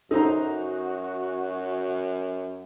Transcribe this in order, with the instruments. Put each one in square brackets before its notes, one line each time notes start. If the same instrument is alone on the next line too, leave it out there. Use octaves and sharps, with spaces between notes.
[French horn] F#2 [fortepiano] D#4 C5 A#5 [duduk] F#4 [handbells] A4